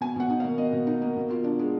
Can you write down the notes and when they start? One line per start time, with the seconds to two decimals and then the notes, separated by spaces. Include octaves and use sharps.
0.01 B2 G#5
0.16 B2 F#5
0.30 D#4
0.40 F5
0.44 A#3
0.58 B2 D#5
0.73 B2
0.87 D#4
1.02 A#3
1.17 B2
1.30 F4
1.44 D4
1.59 G#3